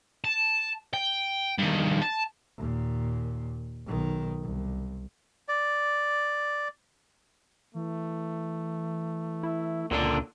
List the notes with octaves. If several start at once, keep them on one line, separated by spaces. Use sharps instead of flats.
A5
G5
G2 D#3
A5
D#2 A#2
B1 D#3
C2
D5
E3 A3
E4
C#2 A#2 D3 D4